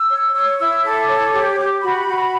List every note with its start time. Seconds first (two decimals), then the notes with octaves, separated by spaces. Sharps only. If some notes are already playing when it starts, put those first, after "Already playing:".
Already playing: E6
0.10 C#5
0.33 C#5 E6
0.59 E4 E6
0.83 A4 D6
1.08 C#5
1.33 G4
1.58 G4
1.82 F#4 B5
2.07 F#4